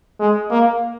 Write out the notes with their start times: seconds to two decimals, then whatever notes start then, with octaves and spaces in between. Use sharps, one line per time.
0.20 G#3
0.51 A#3